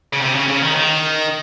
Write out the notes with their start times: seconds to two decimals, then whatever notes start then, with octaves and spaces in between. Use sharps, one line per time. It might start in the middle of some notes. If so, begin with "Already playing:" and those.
0.13 C#3
0.21 C3
0.34 C#3
0.48 C#3
0.62 D#3
0.76 D#3